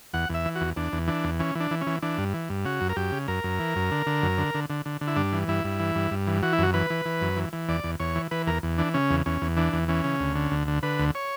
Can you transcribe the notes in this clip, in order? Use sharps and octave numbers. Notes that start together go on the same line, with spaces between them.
E2 F#5
E2 E5
E3
F#4
E2
E2 D4
E2
E3 D4
E2
E3 C#4
E3
D4
E3
C#4
E3
E3 D4
G2
E3
G2
C#3 F#4
F#2
A#4
F#2 G4
C#3
F#2 A#4
F#2
E3
F#2
D3
D3
F#2
D3
D3
D3
D3
D3
E4
G2 D4
E3
G2 E4
G2
E3
G2
G2
E3
E3 F#4
E4
F#2 F#4
E3 B4
E3
E3
F#2
E3
E3
E2 D5
E2
E2 C#5
E3
E3 B4
E2 A#4
E2
E3 D4
C#3 C#4
E2
E2 C#4
E2
E3 D4
E2
E3 C#4
C#3
D2
D3
D2
D3
D3 B4
D2
C#5